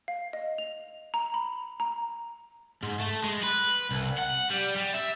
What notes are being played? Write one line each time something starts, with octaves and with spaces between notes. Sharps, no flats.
F5
D#5
F7
A#5
B5
A#5
G#2
A3
G#3
B4
C2
F#5
G3
G3
E5